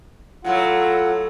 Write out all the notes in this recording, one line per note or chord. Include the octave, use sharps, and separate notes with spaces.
A2 F#3 A3 F4 F#5